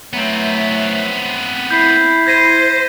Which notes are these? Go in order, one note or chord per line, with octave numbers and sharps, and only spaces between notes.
E3 F#3 A3 B3 C4
E4 G6 B6 C7
C5 G#6 A#6 D#7